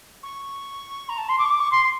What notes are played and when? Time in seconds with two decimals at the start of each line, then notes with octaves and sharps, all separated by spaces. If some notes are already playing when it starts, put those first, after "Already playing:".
0.23 C#6
1.09 A#5
1.18 A5
1.29 C6
1.39 D6
1.45 C#6
1.50 D6
1.60 C#6
1.72 C6